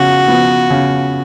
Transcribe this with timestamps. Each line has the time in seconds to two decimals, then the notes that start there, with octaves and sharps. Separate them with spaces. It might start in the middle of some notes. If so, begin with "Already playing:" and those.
Already playing: C#3 F3 B3 F#4
0.28 F3 B3
0.70 C#3